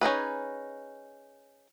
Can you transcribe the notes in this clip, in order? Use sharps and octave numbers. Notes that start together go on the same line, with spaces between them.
C#4 D#4 G#4 B4